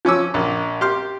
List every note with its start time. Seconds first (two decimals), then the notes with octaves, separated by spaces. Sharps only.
0.05 F3 C#4 D6 E6
0.34 A#1
0.81 G4 C6 F6